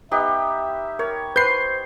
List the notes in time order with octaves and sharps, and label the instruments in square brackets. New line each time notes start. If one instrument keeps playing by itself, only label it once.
[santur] B3 D#4 G4 [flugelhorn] E5
[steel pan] A#4 [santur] C#5
[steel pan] B4 [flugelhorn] C5 [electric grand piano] G6 C7